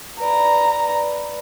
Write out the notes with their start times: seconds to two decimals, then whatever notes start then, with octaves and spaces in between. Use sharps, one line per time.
0.20 B4 D5 A#5 B5